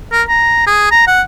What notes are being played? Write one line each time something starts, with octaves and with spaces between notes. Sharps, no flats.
A#4
A#5
G#4
A#5
F#5